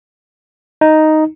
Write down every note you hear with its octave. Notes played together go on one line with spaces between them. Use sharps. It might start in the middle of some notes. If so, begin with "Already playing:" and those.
D#4